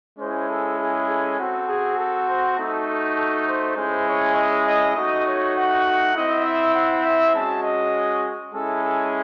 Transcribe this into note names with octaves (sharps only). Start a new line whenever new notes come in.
G#3 C#4 E4 C5
A4
G#4
A4
C4 F#4
G#4
A4
C5
A3 D#4 F#4 A4
A4
A4
C5
G#3 C#4 E4 C5
C#5
D#5
D#5
A3 D#4 F#4 D#5
C#5
F#5
C4 E4 D#5
E5
F#5
E5
G#3 C#4 F#4 A5
D#5
G#3 C#4 E4 A4
A4